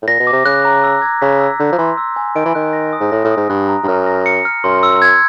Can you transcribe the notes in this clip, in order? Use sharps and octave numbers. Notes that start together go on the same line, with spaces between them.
A2
A#2 A#6
B2
D6
C3
C#3 F#6
A#5
E6
G#6
C#3 B6
E6
D3 G6
F3
E3 C6
E6
G#5
D#3 D7
E3
D#3 F#6
A#6
D#6
G#2
A2 A#6
A2
D#6
G#2
G2 F#6
A#5
G2
F#2 F6
A#6
C#7
F6
F#2 C6
E6
G#6